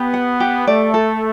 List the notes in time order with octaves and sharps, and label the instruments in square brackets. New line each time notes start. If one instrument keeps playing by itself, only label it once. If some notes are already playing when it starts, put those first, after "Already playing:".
Already playing: [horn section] B3 [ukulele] G4
[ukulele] F#5
G4
[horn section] A3 [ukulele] D5
[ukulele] A4